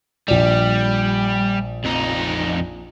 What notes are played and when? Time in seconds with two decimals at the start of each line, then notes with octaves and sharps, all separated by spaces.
0.28 A#1 G3 D5
1.85 F2 D#4